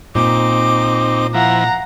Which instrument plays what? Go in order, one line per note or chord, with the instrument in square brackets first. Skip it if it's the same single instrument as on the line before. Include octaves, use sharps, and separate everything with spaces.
[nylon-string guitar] A#2 [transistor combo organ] C4 D#4 [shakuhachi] D6
[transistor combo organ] F3 E4 [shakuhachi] F5 [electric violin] F#5 A#5